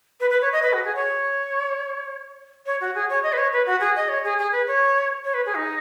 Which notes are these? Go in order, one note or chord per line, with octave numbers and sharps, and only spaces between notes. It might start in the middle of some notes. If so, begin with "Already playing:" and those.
B4
B4
C#5
D#5
B4
F#4
G#4
C#5
C#5
F#4
G#4
C#5
D#5
B4
C#5
B4
F#4
G#4
D#5
C#5
G#4
G#4
B4
C#5
C#5
B4
G#4
D#4